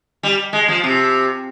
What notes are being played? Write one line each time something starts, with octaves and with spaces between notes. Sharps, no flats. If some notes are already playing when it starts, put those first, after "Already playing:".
G3
G#3
F3
C3